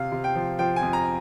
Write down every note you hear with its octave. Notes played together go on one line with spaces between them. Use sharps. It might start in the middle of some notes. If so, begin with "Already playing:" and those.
Already playing: C3 F5
C3
G5
F3
F3 G5
G#5
F2
A#5